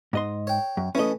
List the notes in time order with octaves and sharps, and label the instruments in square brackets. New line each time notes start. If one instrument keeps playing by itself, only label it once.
[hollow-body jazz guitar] G#2 D#5 C6
[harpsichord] C#5 G5
[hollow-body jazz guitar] F#2
[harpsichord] E3 A3 [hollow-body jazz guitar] C#4 D#5